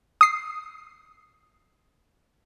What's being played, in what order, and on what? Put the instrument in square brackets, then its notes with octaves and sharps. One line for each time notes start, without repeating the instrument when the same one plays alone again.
[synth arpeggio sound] D#6 C7